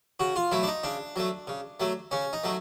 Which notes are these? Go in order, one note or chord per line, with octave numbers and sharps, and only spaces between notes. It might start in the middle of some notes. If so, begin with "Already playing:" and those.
C#3 F#4
F4
F#3 A3 E4
D4
D#4
C#3 D4
F#3 A3
C#3
F#3 A3
C#3 C#4
D#4
F#3 A3